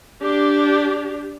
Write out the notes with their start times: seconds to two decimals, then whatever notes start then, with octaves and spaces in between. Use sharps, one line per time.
0.22 D4 G4